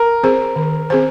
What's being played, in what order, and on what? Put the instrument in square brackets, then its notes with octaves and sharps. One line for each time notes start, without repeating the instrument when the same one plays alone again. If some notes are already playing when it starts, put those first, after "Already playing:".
Already playing: [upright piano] A#4
[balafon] C4 G#4 C5
D#3
C4 G#4 C5